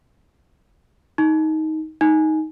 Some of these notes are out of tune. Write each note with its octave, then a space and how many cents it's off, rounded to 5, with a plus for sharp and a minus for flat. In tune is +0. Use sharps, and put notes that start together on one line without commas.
D#4 +15
D#4 +10